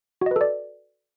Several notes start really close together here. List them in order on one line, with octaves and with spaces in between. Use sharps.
F#4 D#5 B4 A4 D5